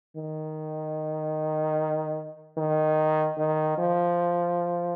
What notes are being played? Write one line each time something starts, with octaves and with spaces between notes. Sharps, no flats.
D#3
D#3
D#3
F3